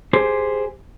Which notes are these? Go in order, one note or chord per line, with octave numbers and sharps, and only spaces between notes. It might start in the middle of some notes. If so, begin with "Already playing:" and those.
G4 G#4 C5